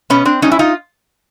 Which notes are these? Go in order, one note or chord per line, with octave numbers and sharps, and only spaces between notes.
B2 B3 C#4
C4 D4
G3 C#4 D#4
E4
D#4 F4